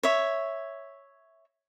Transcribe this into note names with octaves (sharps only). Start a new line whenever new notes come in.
C#5 E5